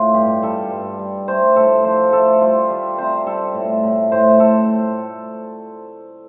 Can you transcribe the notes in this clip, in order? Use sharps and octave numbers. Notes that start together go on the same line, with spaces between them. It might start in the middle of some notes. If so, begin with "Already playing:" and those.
Already playing: A2 F4
G2 G4
G3 A4
G2
G3
A3 C5
A2 A4
F3 C5
A3 A4
G3 F4
G3
C3 C5
G3 A4
A2
A2
A2 C5
A2 A4